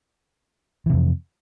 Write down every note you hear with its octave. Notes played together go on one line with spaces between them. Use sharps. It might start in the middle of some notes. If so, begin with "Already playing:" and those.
F2 C3 E3